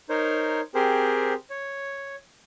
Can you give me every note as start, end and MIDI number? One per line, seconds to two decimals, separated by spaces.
0.09 0.61 63
0.09 0.61 70
0.09 0.61 72
0.09 0.61 73
0.75 1.33 60
0.75 1.33 67
0.75 1.33 68
0.75 1.33 70
0.75 1.33 72
1.50 2.15 73